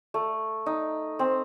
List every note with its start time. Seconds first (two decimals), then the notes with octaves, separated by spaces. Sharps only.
0.14 A3
0.66 D#4
1.19 C4